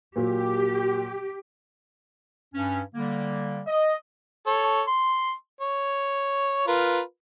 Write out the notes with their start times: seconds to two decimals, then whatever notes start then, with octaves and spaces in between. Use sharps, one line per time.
0.16 A#2 F#3 G4
2.55 G2 C#4
2.95 D3 G3 A#3
3.66 D#5
4.47 A4 C#5
4.87 C6
5.61 C#5
6.67 F4 A#4 B4